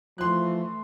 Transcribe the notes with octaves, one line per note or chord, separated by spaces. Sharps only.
E3 F3 A3 E4 C6 F#6